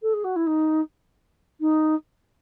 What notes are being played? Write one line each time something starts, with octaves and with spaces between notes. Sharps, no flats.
A4
G#4
F#4
E4
D#4
D#4